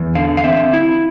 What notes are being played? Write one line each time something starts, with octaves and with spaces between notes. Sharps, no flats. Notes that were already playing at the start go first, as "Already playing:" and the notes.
Already playing: E2
D3 F5
F5
C4 E5
E4